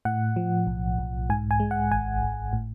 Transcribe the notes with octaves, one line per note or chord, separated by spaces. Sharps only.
A2 F#5
F3
B1
B1
G#2 G#5
G#5
G#3
F#5
G#1 G#5
G#1
A2